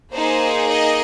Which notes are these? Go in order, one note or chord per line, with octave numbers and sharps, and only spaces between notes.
A#3 D#4 G#4 C5
D#5